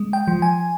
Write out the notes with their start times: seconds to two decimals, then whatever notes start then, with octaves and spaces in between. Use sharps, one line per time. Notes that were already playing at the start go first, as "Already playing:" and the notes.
Already playing: G#3
0.13 G5
0.28 F3
0.42 G#5